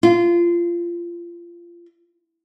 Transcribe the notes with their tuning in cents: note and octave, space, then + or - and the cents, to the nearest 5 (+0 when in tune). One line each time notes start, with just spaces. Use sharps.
F4 -25